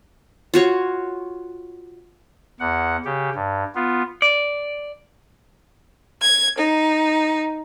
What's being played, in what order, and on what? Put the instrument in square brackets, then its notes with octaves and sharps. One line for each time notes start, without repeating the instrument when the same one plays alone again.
[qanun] F4 F#4 C#5
[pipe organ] E2 F#5
C#3 G4
G2
B3 F4
[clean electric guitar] D5
[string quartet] G#6
D#4